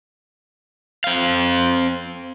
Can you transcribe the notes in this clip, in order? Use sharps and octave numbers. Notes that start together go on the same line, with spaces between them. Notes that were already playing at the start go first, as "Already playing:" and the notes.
C4 F5